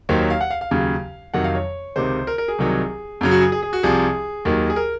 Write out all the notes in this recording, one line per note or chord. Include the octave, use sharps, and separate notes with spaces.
D#2 D#3 F#3 C5
C#5
F5
F#5
F5
F5
D#2 C#3 F#3
F2 C3 D#3 F#3 F#5
F5
C#5
C#2 C3 D#3 C5
A#4
A#4
G#4
C2 C3 D#3 F#3
F#2 C#3 F#3
F#4
G#4
G#4
G#4
F#4
C2 C3 F3 G#4
D#2 D#3 F#3
G#4
A#4